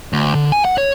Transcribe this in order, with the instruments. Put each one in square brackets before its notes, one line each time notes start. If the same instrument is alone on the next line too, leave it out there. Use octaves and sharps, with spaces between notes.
[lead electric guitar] D2
D3
G#5
F#5
C#5